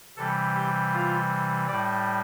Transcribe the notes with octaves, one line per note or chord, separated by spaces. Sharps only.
C3 E3 G3 A4
G4
F4
A2 G3 D5